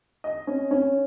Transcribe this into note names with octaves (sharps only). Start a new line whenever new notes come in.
D#5
C#4
C#4